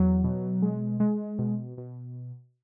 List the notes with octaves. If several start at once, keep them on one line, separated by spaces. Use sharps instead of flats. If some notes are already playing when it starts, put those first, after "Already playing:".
Already playing: E2 F#3
B2
G#3
G#3
B2
B2